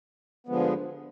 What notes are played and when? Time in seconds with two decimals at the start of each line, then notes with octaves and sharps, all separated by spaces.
0.47 G2 D3 F3 G#3 B3